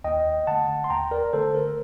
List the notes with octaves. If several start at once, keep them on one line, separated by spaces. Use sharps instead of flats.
D#2 D#5 G5
D3 A3 F#5 A5
C6
D#2 G5 A#5
A#4 D5
D3 A3 A4 C5
A#4